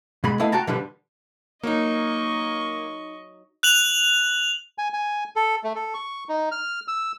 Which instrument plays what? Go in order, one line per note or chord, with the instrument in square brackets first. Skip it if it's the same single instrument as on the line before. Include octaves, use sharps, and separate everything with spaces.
[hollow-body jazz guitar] B2 G#3 B5
A3 B3 E4 D#5 F5
F#4 G5 A5 A#5
B2 D3 F3 G3 B3
[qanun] F#3 D#4 [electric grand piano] A#3 [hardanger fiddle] D#5 C#6
[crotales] F#6 F7 F#7
[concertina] G#5
G#5
A4
A3
A4
C#6
D#4
F6
E6